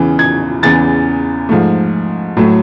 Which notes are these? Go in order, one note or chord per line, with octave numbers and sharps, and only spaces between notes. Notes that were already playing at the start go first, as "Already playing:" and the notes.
Already playing: E2 C#3 E3
G#6
E2 C#3 E3 A6
G#2 F3 A3
A2 F#3 A3